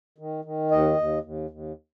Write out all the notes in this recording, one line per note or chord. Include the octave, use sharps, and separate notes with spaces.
D#3
D#3
D#2 D#5
D#2
D#2
D#2